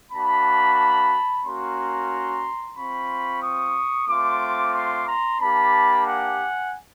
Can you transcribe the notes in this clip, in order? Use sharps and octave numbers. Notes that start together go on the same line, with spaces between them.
A#3 D4 F#4 A5 B5
A#3 C#4 F#4 A#5 C6
C4 F4 B5 C#6
C#6 D#6
A3 C4 F4 C6 D6
C6 D6
A#5 C6
A#3 D4 G4 A5 B5
F#5 G#5